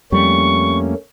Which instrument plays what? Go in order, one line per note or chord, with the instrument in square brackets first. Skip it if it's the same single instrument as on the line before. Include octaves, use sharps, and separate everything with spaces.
[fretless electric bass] F2 G3 [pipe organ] A3 A#3 C#4 [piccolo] C#6